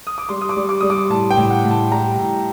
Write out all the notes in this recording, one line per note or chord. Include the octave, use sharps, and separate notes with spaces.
D#6
D6
G3 C6
D#6
D6
G3
D6
G3 D#6
D6
A2 A5
G5
A2
F#5
A2
A5
G3 A#5
A2